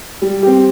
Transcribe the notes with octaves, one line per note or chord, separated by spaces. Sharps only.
G3
C4 G4